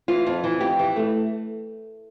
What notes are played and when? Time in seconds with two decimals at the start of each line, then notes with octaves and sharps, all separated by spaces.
0.08 E3 F4
0.26 F2
0.44 E3
0.61 F2 G4
0.79 E3
0.96 A3